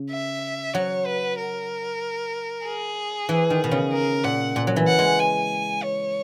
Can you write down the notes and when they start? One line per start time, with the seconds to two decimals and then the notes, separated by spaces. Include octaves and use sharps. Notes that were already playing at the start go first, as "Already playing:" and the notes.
Already playing: C#3
0.10 E5
0.74 F#3 C#5
1.05 B4
1.38 A#4
2.65 G#4
3.29 E3
3.50 D#3
3.64 B2
3.71 C#3
3.92 A#4
4.24 A#2 F#5
4.56 A#2
4.67 F#3
4.76 E3
4.87 F#5
4.99 G#3
5.19 G#5
5.83 C#5